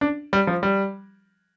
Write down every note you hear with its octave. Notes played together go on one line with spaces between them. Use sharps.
D4
G3
F3
G3